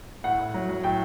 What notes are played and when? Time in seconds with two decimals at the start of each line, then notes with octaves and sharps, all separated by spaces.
0.24 A2 F#5
0.39 A2
0.54 F#3
0.69 F#3
0.84 A2 G5